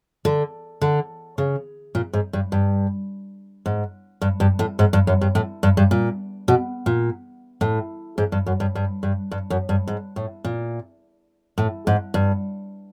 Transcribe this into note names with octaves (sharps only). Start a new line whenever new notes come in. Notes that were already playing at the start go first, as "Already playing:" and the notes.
D3
D3
C#3
A#2
G#2
G2
G2
G#2
G2
G2
A2
G#2
G2
F#2
G2
A2
G2
G2
A#2
B2
A#2
A2
G#2
G2
F#2
G2
G2
G2
G2
F#2
G2
G#2
A2
A#2
A2
G#2
G2